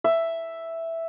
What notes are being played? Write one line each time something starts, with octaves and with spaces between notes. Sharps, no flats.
E5